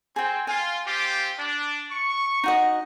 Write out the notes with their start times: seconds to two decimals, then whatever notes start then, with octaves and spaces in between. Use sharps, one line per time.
0.16 C4 G#4 G5
0.47 F4 G#5
0.85 C4 F4 G4
1.37 D4
1.90 C#6
2.44 D#4 F#4 D#5